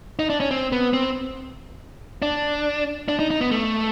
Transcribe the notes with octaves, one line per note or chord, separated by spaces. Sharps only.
D#4
D4
C#4
C4
B3
C4
D4
D4
D#4
D#4
B3
A3